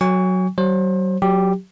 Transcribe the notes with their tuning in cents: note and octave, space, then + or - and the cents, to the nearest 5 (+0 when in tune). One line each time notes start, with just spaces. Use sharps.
F#3 +0 G#5 -30 C#6 +25
F#3 +40 C5 +35
F#3 +0 G4 +0